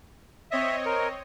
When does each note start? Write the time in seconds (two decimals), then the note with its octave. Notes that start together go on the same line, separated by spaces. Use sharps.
0.51 C4 C#5 D#5 E5
0.86 A#4